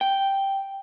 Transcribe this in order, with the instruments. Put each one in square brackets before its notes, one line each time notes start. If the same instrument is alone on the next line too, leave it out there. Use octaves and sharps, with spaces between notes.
[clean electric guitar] G5